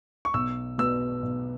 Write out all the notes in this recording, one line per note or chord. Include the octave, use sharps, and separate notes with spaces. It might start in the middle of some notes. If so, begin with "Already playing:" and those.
C#6
B1 E6
B2 B3 E6
B1